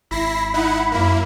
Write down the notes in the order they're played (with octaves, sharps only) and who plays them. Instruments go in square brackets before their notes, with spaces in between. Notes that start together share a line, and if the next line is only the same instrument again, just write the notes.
[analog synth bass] G#1 [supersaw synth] E4 A#6 C7 [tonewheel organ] B5
[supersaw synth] D#4 E4 F#5
[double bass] F#2 [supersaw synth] A#3 E4